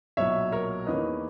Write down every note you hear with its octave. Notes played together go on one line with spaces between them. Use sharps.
B1 A#2 F#3 C#5 E5
A#4 C#5
E2 D#3 A#3 C#4 B4 D#5